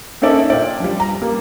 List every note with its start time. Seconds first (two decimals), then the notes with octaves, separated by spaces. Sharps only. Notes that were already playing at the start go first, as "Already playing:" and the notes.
0.22 A#3 C#4 D#4 A4 D5 E5
0.50 A#2 D5 G5
0.80 F3 G3
1.00 A#5
1.22 G3 A#3